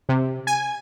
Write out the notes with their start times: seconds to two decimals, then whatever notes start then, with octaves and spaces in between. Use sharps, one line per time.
0.09 C3
0.47 G#5